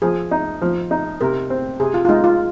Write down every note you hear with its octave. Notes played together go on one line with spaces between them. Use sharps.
F3 G#4
D#4
F3
D#4
C3 A#4
C4
C3 G#4
F4
F4
G#3 D#4
F4